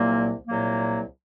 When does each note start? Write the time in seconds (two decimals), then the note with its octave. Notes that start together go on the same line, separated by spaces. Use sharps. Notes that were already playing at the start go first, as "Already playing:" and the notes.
Already playing: C2 A#2 F#3 A#3
0.47 C2 A#2 F#3 A#3